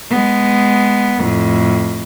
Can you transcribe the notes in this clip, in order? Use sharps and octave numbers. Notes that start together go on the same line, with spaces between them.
G#3 B3
F2 A2